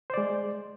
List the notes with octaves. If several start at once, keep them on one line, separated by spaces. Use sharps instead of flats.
G#3 C5 D5